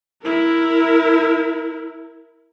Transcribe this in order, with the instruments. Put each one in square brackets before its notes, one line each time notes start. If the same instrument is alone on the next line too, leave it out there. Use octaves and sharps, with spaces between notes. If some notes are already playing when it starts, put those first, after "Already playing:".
[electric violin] E4 A#4